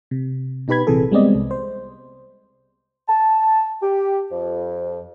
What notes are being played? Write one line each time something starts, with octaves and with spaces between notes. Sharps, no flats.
C3
B2 D#4 G4 B4 B5 G#6
A#1 C3 E3 G#4 A4
G3 G#3 B3 C4 D5 D#5
C2
C5
A5
G4
F2